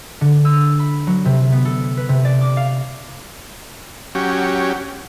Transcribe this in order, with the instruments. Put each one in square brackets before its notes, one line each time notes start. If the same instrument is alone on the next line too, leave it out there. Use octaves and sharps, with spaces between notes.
[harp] D3
E6
B5
F#3
C3
B3
A4
B4
C3
D5
D6
F5
[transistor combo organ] F#3 C#4 G4